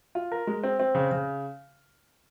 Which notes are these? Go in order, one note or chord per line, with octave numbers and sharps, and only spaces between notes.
F4
A#4
G#3
C4
C4
C#3
C#3